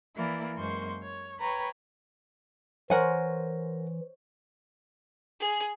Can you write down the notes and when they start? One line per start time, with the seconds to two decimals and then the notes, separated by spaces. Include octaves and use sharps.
0.16 E3 A#3 E4 D5
0.57 F#2 G#3 A#3 C5 C6 C#6
1.03 C#5
1.40 B4 C#5 G5 A#5
2.90 E3 A#4 C5 C#5 F#5 G#5
5.40 G#4